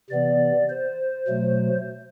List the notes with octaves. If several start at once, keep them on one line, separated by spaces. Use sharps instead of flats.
C3 E3 B3 D5
C5
B2 F#3 A3